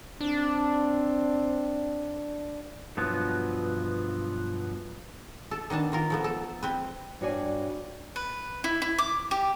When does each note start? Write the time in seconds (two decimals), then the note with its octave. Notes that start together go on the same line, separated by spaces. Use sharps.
0.21 C4 D4
2.97 G2 B2 F3 F#3 B3
5.51 A4
5.70 D#3 B3 D4 A5
5.92 D#3 F4 A#4
6.10 F3 A3 B3
6.24 A4
6.63 C4 B4
7.21 G2 D4 F#4 C#5 D5 G#5
8.16 B4
8.64 E4
8.82 E4
8.98 D6
9.31 G4